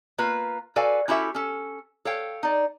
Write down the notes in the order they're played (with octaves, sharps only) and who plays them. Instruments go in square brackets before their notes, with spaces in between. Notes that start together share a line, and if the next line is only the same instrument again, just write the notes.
[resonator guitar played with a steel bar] A#3 F4 B4
F#4 A4 B4 D5 F5 G#5
C#4 E4 F#4 G4 A4 E5
C#4 A4
A4 C#5 F5 G5
D#4 D5